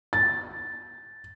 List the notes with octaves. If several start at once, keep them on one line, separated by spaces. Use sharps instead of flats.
A6